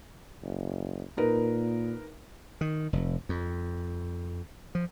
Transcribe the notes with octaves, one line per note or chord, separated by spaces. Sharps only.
F#1
A#2 D#4 A#4 B4
D#3
F1
F2
F3